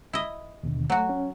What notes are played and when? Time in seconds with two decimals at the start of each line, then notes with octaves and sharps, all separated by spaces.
0.13 E4 D#5
0.63 D#2 B2 D3
0.90 F#3 A3 F#4
1.09 C#4